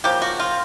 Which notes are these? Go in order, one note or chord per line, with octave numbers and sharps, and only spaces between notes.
C#3 F3 A#3 G4
F#4
F4